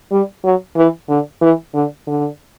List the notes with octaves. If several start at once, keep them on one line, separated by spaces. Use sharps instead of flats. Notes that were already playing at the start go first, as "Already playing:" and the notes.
G3
F#3
E3
D3
E3
D3
D3